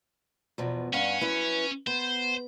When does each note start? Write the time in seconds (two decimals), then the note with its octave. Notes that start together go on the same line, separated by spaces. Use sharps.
0.58 E2 B2 F3
0.93 G2 C#4 F5 F#5
1.21 F#2 E4 B4
1.87 B3 C5